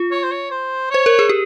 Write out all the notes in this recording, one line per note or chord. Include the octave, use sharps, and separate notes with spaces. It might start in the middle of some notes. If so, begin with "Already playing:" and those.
Already playing: F4
C#5
C5
C#5
C5
C5 C#5
A#4
G#4
G4